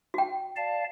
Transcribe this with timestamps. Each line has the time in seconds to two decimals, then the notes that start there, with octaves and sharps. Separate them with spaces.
0.14 F#4 G5
0.56 D5 F5 A5